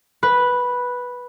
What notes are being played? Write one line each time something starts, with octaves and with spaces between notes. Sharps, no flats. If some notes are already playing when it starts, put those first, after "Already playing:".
B4